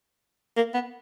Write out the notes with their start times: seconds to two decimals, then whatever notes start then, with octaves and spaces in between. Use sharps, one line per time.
0.57 A#3
0.74 B3